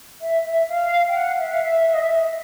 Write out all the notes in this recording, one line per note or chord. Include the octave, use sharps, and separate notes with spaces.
E5
E5
F5
G5
F#5
E5
F5
E5
E5
D#5
E5